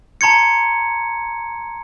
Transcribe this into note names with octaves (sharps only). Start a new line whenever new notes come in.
A5 A#5 C6 G#6 C#7